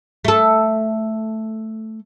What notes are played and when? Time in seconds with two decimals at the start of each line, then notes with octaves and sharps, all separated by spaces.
0.25 A3 A4